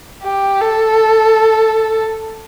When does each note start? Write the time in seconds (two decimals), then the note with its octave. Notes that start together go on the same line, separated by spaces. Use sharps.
0.23 G4
0.61 A4